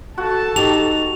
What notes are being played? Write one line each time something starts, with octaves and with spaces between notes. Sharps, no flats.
F#4 A4 A5
D#4 G4 F7